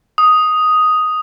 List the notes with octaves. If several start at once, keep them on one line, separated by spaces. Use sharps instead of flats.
D#6